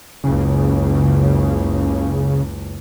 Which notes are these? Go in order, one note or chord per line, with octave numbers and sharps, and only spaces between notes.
F#1 C#2 C#3